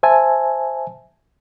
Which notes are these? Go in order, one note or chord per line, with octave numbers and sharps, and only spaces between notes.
C5 E5 G#5 A5